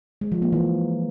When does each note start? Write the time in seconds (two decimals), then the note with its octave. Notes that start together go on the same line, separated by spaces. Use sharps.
0.21 G#3
0.32 F3
0.42 A#3
0.52 E3